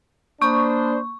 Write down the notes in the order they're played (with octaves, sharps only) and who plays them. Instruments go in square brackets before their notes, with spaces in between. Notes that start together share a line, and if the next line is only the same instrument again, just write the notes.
[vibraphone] A#3 B5 D#6 [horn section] D4 C5 [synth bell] C#6